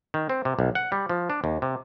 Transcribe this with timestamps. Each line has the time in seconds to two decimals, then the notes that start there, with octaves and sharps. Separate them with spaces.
0.14 D#3
0.29 C4
0.45 C3
0.59 B1
0.75 F#5
0.92 G3
1.09 F3
1.30 D4
1.44 D#2
1.62 C3